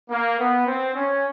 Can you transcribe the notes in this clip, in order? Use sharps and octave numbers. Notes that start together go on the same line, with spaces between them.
A#3
B3
C4
C#4